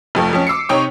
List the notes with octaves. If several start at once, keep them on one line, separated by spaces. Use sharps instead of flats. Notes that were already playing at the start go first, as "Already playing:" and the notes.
F1 F2 A3
F2 C#4
D6 E6 C7 C#7
C3 D#4 C#5 G5 C#6 D#6